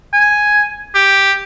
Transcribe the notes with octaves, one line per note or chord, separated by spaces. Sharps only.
G#5
G4